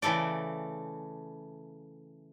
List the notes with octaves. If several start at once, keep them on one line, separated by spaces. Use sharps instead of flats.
C#3 E3 A3 A4 D5